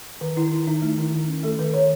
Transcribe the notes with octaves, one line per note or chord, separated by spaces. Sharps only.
D#3 B4
D#3 E4
D#3 E4
D#3 D#4
A3 D#4
D#3 E4
D#3
C#4
A3 A4
D#3 B4
D#3 C#5